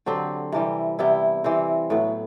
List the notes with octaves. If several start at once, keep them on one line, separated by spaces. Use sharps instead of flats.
D3 F#3 C4 G4
C3 E3 G3
C3 G3 B3 E4
E3 G3 C4
A2 F#3 B3